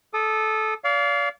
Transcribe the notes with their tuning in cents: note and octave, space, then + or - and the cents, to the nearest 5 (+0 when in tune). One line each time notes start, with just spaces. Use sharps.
A4 -15 D#6 -30
D5 -40 F5 +0